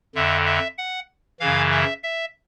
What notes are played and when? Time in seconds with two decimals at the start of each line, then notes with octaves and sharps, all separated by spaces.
0.15 F2 D3 E5
0.46 E5
0.78 F#5
1.40 F#2 C#3 E3 F5
1.72 E5
2.03 E5